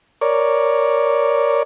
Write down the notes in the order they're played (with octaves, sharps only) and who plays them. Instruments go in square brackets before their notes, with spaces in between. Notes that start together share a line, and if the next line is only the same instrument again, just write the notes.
[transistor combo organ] A#4 C#5 D5